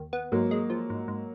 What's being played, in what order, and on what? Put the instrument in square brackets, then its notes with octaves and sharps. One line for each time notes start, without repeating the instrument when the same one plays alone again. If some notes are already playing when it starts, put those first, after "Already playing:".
Already playing: [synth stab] D#2
B3
[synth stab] G#2 [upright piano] F#3 A#3
[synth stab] G#3
F3
G#2
G#2